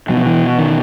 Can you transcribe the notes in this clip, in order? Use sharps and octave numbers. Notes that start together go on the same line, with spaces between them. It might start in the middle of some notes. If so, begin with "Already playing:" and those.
B2 F#3
F3
E3
D#3